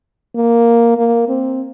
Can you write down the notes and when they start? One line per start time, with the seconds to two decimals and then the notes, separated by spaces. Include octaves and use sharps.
0.35 A#3
0.98 A#3
1.28 C4